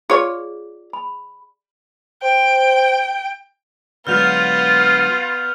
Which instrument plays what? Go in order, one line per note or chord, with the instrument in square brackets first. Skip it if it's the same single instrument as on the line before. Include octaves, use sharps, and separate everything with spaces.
[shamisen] F4 C#5 [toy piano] G#4 D5
[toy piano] B5
[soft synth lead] C5 [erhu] G5
[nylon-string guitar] D3 F#3 G#3 [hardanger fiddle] B3 [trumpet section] F4 [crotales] F6 G6 F7